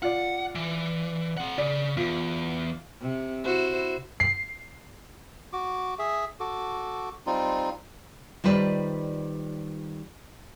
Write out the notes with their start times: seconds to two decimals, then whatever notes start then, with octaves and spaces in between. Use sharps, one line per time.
0.02 F4 D5 F#5
0.55 E3
1.37 C4 F#5
1.58 C#3 D5
1.97 E2 F4
3.01 C3
3.44 E4 F#4 C5
4.20 C7
5.53 F#4 D6
5.99 G#4 E5
6.40 F#4 A4 D6
7.26 G3 C4 D#4 F4
8.44 D#3 G3 F4 B4 C5 D5